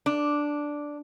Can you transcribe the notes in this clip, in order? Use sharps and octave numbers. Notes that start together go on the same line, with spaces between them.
D4